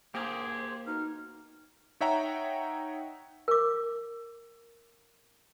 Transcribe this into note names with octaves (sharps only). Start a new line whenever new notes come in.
A#3 G4 G#4 C5
B2 D#4 F6
D#4 C#5 E5 F#5 G5 A#5
A#4 D6